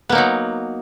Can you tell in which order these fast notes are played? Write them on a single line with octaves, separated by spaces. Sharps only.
B3 A#3 D#4 F#3